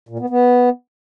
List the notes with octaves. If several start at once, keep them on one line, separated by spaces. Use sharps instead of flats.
A#2
B3
B3